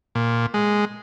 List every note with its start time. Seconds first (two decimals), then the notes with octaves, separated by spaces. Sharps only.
0.15 A#2
0.54 G#3